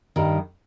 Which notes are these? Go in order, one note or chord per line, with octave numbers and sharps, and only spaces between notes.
G2 D#3 G3